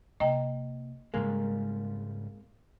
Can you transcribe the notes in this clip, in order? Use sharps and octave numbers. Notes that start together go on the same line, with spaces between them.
C3 A#3 D#5 G5 A#5
G#2 C#3 G3 G#3 A#3 C4